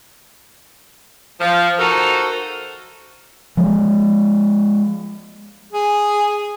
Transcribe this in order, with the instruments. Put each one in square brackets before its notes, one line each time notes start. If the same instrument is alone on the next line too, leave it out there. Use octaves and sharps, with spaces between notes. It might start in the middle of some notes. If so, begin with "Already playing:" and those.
[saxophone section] F3
D#4 F#4 A4 A#4 C5
[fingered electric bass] F3 G#3
[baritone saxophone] G#4